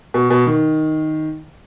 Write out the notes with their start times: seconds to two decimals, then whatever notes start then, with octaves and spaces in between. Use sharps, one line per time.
0.14 B2
0.30 B2
0.47 D#3